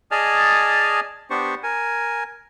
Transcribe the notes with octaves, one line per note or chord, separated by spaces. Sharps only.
G#4 D5 D#5 G#5 A5 F6
B3 D4 G4 C5 C#6
A#4 G#5